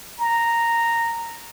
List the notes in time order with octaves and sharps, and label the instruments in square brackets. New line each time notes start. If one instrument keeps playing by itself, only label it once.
[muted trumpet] A#5